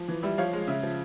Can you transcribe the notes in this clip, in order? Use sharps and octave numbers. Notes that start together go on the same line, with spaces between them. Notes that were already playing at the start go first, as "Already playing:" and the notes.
Already playing: F3
E3
G3 E5
F3 C#5 F5
G#3
C#3 E5
F3